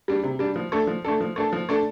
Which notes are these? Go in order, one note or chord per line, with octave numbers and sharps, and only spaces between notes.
G3 D4
C3
G3 D4
F3
A3 D4 A4
F3
A3 D4 A4
F3
A3 D4 A4
F3
A3 D4 A4